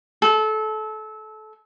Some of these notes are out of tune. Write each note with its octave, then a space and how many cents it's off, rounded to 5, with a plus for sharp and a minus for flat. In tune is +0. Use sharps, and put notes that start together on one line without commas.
A4 -25